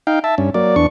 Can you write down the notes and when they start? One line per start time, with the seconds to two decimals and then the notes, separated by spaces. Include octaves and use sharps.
0.07 D#4 F5 G5
0.24 E5 A5
0.38 G2 C#4
0.54 F#3 A#3 D5
0.76 E2 D4 C#6